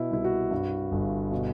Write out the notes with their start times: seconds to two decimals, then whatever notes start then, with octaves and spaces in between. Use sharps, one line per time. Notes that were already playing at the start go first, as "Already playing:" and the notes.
Already playing: B2 E4
0.11 C2 E4
0.24 F#4
0.51 G2
0.92 G1
1.31 B2